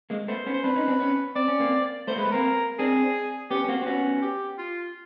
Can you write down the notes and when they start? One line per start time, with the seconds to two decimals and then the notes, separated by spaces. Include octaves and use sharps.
0.10 G#3 A#3
0.28 A3 B3 C5
0.46 B3 C#4
0.54 C5
0.64 C4 D4 B4
0.76 C#4 D#4
0.88 C4 D4
1.00 B3 C#4
1.36 C4 D5
1.48 C#4
1.60 A#3 C4
2.07 A3 B3 C5
2.16 G#3 A#3 B4
2.25 A3 B3
2.31 A#3 C4 A#4
2.79 C4 D4 G#4
3.51 B3 C#4 G4
3.64 C#4
3.68 A#3 C4 F#4
3.82 C4
3.86 B3 C#4 F#4
4.22 G4
4.58 F4